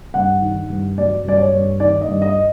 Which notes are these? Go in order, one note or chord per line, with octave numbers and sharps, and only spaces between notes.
G2 F#5
D#3
G2
F#3 D5
G2 D5
C#5
G2
D#3 D5
D#5
G2
D#5